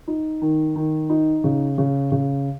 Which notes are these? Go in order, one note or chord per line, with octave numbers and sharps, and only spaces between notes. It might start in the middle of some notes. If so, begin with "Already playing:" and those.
D#4
D#3
D#3
D#4
C#3
C#3
C#3